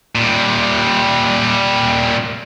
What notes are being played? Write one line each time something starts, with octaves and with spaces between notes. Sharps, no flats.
A#2 G3